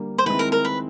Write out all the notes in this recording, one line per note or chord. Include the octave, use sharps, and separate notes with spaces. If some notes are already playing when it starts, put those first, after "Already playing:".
Already playing: D3 G3 A#3
C5
D#3 G#3 C4 E4 B4
A#4
A#4
B4